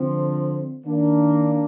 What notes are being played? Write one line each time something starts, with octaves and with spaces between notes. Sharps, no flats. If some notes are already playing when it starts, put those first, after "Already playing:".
Already playing: D3 F3 C4
D#3 A#3 D4